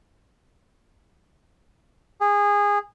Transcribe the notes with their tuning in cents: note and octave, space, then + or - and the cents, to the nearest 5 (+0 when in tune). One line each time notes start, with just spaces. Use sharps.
G#4 -20